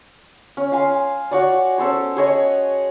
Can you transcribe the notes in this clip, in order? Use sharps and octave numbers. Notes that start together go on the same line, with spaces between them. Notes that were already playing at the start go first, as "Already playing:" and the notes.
C#4
F5 G#5 C6
F#4 C#5 D5
C#4 A4 C5 C#5
G#4 C#5 D#5